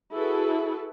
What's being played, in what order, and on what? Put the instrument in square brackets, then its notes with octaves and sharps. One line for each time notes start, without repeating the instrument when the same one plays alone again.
[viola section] E4 F#4 G#4 A4 B4